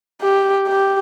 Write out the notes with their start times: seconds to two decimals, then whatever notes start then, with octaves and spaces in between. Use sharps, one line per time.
0.22 G4
0.68 G4